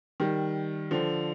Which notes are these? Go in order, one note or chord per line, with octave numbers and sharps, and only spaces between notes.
D#3 G3
D3 F3